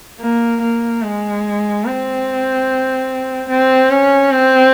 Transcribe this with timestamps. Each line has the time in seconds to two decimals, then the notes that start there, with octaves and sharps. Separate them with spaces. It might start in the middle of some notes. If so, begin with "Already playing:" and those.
0.20 A#3
0.61 A#3
1.02 G#3
1.85 C4
3.49 C4
3.90 C#4
4.31 C4